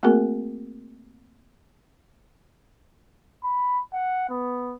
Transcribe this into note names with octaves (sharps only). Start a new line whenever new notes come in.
A3 A#3 C4 F#4 G#4 A#4
B5
F#5
B3